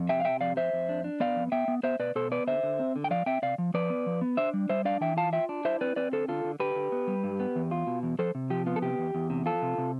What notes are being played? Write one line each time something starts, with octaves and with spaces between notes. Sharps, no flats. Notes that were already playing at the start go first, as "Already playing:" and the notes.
Already playing: F2
C3 E5 G5
F5
C3 E5 G5
F2 D5 F5
F2 C5 E5
F2
D4
D4
B3 D5 F5
F2
B3 E5 G5
B3
B3 C5 E5
B2 B4 D5
B2 A4 C5
B3 B4 D5
D3 C5 E5
D3
C4
D3
G5
F3 D5 F5
C4 E5 G5
C3 D5 F5
F3
F3 B4 D5
B3
F3
B3
D4 C5 E5
G3
G3 C5 E5
D4 D5 F5
E3 E5 G5
F4 F5 A5
F4 E5 G5
D4
E4 C5 E5
C4 B4 D5
C4 B4 D5
D3 A4 C5
D3 F4 A4
D3
D3 G4 B4
D3
B3
G3
G2
B3
E2
F4
B2
E2
F3 A4 C5
C3
F3 G4
B3 F4
A4
C3 G4
E2
E2
C3
F3 F4 A4
C3
C3